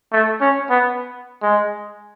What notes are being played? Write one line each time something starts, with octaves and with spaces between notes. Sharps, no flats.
A3
C#4
B3
G#3